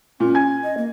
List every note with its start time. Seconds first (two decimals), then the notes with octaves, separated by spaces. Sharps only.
0.20 A#2 C#4
0.35 G#5 G#6
0.64 D#5
0.77 A#3